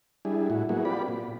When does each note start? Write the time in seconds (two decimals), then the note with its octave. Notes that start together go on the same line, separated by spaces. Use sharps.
0.25 G3 D4 E4 G#4
0.50 A2 E4 F#4
0.69 F#3 A#3 B3 E4 F#4 G#4
0.85 C4 F4 G4 D5 B5
1.08 A#2